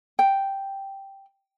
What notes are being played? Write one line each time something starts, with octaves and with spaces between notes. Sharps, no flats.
G5